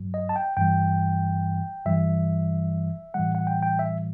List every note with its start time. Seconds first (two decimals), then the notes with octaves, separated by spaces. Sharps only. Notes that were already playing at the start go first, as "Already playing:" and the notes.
Already playing: G2 F#3
0.14 D#5
0.29 A5
0.36 G5
0.57 G2 E3 G3 G5
1.86 G2 E3 G3 E5
3.14 A2 E3 G3 F#5
3.35 F#5
3.47 G5
3.63 G5
3.79 E5